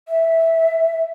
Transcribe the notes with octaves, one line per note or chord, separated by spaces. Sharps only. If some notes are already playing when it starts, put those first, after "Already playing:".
E5